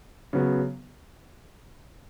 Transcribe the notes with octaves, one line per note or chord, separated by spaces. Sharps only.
C#3 F#3 B3